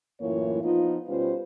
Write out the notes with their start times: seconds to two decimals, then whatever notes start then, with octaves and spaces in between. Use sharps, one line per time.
0.21 F#2 A2 E3 A#3 F4 C#5
0.63 F3 B3 D#4 F4
1.08 B2 G3 C#4 F4 B4 C5